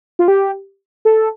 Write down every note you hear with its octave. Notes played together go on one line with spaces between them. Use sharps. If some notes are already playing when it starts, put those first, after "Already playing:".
F4
G4
A4